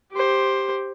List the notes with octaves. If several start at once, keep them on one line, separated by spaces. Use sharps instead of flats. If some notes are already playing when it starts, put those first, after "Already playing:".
G4 C5